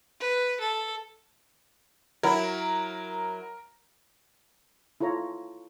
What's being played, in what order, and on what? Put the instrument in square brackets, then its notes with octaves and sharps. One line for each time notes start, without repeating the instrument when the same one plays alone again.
[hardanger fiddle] B4
A4
[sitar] F#3 E4 [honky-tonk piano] A#4
[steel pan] E4 F4 A4 C#5 A#5